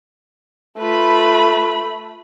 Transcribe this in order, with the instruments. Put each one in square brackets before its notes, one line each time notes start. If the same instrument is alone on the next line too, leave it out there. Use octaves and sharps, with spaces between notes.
[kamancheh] A3 B5 [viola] F4 B4